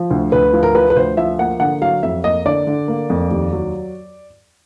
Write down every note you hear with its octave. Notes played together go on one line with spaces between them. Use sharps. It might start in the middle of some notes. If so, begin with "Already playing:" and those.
Already playing: F3
D2
D2 B4
F3
A#4
F3 B4
B4
D2 C5
F3 E5
A#3 F#5
D3 F#5
F#3 F5
F2 E5
A#3 D#5
D3 D5
D3
A#3
F2
D#2
F#3